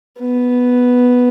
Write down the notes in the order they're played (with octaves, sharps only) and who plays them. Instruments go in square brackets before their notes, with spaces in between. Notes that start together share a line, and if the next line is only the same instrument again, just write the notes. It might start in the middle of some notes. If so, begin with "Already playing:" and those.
[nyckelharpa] B3